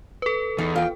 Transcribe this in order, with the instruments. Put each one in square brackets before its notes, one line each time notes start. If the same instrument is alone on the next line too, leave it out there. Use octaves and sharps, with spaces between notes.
[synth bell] A4 B4
[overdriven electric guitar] E2 [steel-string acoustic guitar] D#4
[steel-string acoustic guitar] F4 G5